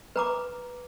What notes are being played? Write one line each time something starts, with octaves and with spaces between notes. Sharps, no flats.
B4 A#5 D6